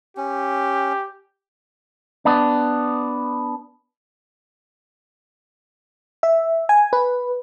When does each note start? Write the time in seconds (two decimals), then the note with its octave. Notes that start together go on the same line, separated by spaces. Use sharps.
0.17 C#4 G4
2.25 B3 D4
6.23 E5
6.69 G#5
6.93 B4